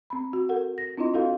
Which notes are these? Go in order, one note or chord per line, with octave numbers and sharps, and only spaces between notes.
C4 B5
F#4
A4 A#4 F#5
A#6
C4 D4 E4 F4 D#5 C6
E4 F#4 A4 F5